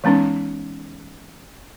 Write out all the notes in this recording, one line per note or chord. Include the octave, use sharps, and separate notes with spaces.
E3 G#3 B3 C#4 D#4